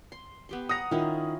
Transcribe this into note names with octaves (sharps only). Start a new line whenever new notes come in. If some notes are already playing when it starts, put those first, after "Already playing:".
C6
B3 G4 C6
F#5 A#5 D#6 A#6
D#3 C#4 E4 F4